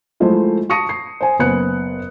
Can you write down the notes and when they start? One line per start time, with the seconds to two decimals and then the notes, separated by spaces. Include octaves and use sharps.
0.20 F3 G#3 A3 E4 C5
0.69 A5 C#6 D#6 A#6 C#7 D#7
0.89 C7
1.21 C5 G#5
1.39 F#1 B3 C5 F#6 C#7